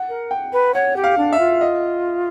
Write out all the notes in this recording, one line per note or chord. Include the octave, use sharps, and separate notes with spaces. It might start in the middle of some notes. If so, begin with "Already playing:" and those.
Already playing: F#5
A#4
G5
B4
C#5 F#5
G4
F5
D4
E5
F4
D#5